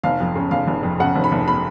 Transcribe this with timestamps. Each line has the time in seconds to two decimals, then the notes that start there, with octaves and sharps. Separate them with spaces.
0.04 F1 F5
0.20 F2
0.36 C#3
0.51 F1 F5
0.67 F1
0.83 F2
1.00 C#3 F#5
1.15 F1
1.24 B5
1.32 F1
1.48 B5